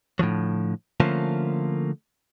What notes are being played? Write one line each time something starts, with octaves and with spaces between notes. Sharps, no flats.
A2 D3 F3 F#3
D3 F3 A3 A#3 C#4 F4